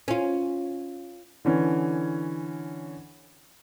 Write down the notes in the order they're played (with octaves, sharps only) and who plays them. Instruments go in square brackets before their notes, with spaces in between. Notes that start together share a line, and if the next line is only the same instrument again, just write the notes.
[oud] C#4 F4
[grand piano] D3 E3 C#4